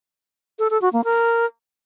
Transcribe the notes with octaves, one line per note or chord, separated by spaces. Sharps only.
A4
A4
F#4
A#3
A#4